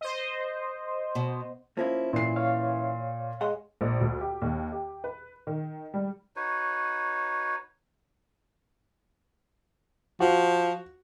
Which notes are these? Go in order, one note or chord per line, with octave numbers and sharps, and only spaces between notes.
C5 D#5
B2
F3 A#3 C#4 E4
A#2 E3 C7
C#5 F5
G#3 F#5 C6
A#1
D2
G4
D#2
G4
B4
D#3
G3
D#4 F#4 B4 C#5
F3 F#4